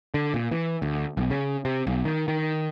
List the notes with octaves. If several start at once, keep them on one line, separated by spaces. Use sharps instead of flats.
D3
A#2
E3
D2
B1
C#3
C3
B1
D#3
D#3